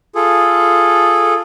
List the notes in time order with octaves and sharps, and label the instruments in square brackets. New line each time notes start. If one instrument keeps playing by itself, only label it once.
[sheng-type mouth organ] F4 G#4 A4